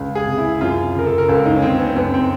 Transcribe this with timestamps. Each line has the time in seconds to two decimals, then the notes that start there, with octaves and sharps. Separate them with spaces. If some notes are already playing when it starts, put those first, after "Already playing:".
Already playing: C#2
0.15 G#4
0.27 C3
0.38 E4
0.61 F#2 F4
0.95 C#3 A#4
1.06 A4
1.18 A#4
1.29 C#2 A4
1.46 D#4
1.56 C#4
1.62 C#3 C4
1.79 B3
1.96 F#2 B3
2.14 C4